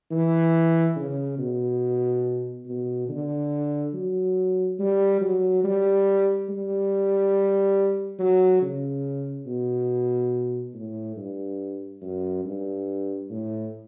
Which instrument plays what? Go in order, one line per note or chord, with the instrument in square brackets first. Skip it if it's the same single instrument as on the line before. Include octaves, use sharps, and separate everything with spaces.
[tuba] E3
C#3
B2
B2
D3
F#3
G3
F#3
G3
G3
F#3
C#3
B2
A2
G2
F#2
G2
A2